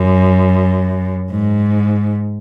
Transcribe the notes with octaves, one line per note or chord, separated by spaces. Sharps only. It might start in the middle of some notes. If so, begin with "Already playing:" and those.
Already playing: F#2
G#2